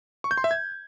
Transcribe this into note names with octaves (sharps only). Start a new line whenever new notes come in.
C#6
G6
C6
E5
G#6